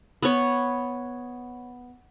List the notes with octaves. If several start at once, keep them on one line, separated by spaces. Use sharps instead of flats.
B3 C#5